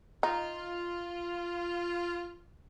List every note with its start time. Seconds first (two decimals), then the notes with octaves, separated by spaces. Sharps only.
0.23 D#4 F4